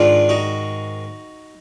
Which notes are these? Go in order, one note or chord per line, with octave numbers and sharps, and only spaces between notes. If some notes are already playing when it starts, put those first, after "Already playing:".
Already playing: G#2 D#3 D4 F4
D#4 F#4